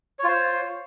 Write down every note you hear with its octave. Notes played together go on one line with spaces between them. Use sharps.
F4 C5 C#5